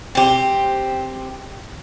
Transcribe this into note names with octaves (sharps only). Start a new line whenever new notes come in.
C4 G4